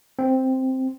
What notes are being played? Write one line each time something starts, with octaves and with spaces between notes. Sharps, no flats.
C4